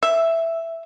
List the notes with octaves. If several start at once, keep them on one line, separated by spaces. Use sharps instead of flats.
E5